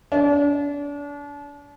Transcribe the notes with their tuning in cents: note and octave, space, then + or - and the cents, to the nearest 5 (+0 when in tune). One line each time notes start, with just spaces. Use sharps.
D4 -35